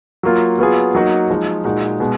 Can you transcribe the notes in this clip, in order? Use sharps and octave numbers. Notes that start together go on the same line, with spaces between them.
F#3 A#3 F4
F#3 B3 F4 G#4
F#3 A#3 D#4 F#4
F3 G#3 D#4
A#2 G#3 D#4 F#4
B2 G#3